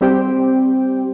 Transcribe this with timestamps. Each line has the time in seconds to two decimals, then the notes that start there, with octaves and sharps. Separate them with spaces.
0.01 G3 C4 G4 C5 G5